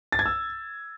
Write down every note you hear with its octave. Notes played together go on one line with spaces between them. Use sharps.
A6
G#6
E6